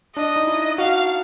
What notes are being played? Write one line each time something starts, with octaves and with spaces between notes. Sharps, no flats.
D4 D#5
D#4
E4
F#4 F5